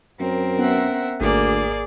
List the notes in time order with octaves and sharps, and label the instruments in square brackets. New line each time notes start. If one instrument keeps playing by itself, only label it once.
[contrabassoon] F#2 [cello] C4 A#4
[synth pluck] B3 C#4 [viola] E5 F#5
[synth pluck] G#1 [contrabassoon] D2 [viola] A#3 [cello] G#4 D5